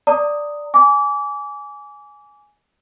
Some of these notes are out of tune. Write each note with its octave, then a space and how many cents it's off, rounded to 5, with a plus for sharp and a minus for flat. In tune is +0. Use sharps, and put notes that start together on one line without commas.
D5 +0 A#5 -35 D#6 +0
G#5 +0 D6 -30